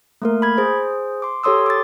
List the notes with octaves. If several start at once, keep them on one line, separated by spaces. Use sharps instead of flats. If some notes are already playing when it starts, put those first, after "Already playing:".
A3 A#3 A#4
B5 G#6
G#4 C5
C6 D6
G4 A4 C#5 C6 D#6 E6
D6 A6